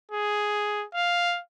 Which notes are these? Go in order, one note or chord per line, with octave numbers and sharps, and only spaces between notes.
G#4
F5